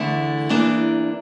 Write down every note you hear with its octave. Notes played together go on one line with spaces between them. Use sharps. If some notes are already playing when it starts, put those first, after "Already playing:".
Already playing: E2 D3 A3 E4
E2 E3 A#3 D4